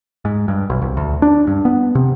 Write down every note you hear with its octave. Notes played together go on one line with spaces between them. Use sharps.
G#2
G2
B1
C2
D2
D4
G2
B3
C3